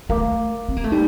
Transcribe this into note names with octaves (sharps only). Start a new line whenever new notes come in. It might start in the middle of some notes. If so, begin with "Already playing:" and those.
A3 A#4 F5 A#5 D6
C4
A#3
A3
G3 D#4